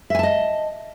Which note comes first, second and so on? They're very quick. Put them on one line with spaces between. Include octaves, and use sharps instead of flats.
E5 G#5 A5 D#5